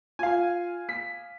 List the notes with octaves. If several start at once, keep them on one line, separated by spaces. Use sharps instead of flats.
F4 F5 G#5
B6